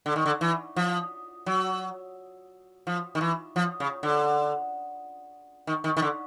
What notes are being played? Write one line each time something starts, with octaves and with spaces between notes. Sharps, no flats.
D3
D#3
D3
E3
F3
F#3
F3
D#3
E3
F3
C#3
D3
D#3
D#3
D#3
D3